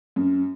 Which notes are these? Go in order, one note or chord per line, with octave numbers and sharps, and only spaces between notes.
F#2